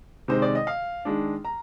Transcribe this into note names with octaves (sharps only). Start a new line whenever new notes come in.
C3 D#3 G#3 C5
D5
D#5
F5
D#3 G#3 D4
A#5